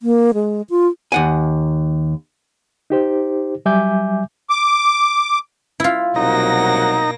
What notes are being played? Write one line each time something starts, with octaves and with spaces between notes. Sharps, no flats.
A#3
G#3
F4
D#2 F#5 G#5
D#4 G4 C5
F#3 G3 E5 G#5 D6 G6
D6
E4 F4
C2 B2 F#3 A#3 D#4 F#5 A#5 A#6